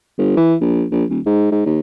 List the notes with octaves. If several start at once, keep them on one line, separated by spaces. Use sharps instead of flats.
G1
E3
A#1
A#1
D#1
G#2
G#2
D#2